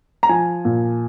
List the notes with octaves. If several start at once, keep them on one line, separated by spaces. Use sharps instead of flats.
A#5
F3 G#5
A#2